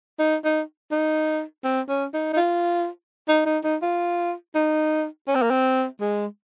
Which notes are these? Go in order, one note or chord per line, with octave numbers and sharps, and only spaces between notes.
D#4
D#4
D#4
C4
C#4
D#4
D#4
F4
D#4
D#4
D#4
F4
D#4
C#4
C4
A#3
C4
G#3